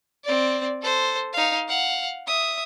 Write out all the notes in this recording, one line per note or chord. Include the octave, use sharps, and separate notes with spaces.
C4 D5
A4 C5
D#4 F5
F5 F#5
E5 D#6